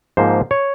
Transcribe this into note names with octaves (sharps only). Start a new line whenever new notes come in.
G#2 F3 A#3 C5
C#5